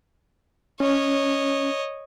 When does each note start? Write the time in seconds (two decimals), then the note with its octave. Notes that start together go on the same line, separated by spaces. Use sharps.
0.80 C#4 C#5 D#5